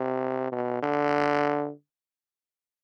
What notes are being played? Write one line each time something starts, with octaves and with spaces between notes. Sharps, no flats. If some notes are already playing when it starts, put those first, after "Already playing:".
Already playing: C3
B2
D3